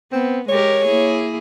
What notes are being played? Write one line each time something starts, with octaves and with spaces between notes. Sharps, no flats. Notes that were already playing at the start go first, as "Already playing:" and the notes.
B3 C4
G#3 G4 A#4 C#5
A#3 E4 G#4